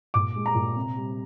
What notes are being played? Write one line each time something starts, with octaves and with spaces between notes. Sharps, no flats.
A#2 D6
G#3
A#5
A#2
C3
G3